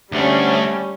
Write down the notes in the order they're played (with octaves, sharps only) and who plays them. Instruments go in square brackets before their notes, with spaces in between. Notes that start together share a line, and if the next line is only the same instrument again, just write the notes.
[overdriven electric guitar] D2 A3 [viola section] G3 C#4